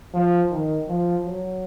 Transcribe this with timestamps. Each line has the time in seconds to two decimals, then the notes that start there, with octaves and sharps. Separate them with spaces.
0.13 F3
0.50 D#3
0.88 F3
1.25 F#3